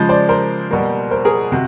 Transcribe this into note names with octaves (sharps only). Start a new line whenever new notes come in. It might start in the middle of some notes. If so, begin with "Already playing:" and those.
Already playing: C#3 F3 G#3
C5 D5
A#4 C5
B2 G3 A#3
A#4 C5
G#4 A#4
C3 F#4